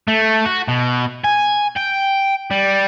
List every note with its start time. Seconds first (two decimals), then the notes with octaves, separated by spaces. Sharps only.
0.08 A3
0.45 F#4
0.68 B2
1.24 G#5
1.76 G5
2.51 G3